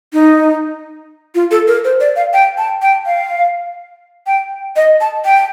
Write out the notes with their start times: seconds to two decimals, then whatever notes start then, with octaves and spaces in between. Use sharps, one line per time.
0.13 D#4
1.35 F4
1.51 A4
1.67 A#4
1.84 C5
2.00 D5
2.16 F5
2.33 G5
2.58 A5
2.82 G5
3.06 F5
4.27 G5
4.76 D#5
5.01 A5
5.25 G5